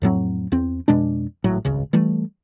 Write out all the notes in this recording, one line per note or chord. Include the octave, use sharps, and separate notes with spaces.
F2 A2 F#3 C4
E2 C4
F2 B2 G#3 D4
G#1 A2 F#3
D#1 G#1 C#2 C#3
E3 G3 A3